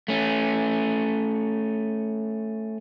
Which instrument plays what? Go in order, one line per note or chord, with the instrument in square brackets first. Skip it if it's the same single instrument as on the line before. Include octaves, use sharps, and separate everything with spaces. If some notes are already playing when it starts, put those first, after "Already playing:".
[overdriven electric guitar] A3 C#4